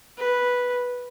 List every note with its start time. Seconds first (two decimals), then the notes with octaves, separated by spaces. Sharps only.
0.18 B4